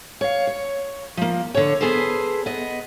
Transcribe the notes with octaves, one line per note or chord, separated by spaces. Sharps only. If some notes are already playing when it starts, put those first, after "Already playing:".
C#5 F5
C#5
F3 A#3
D3 C#5
B3 G#4 A4 B4 C5
B3 D#5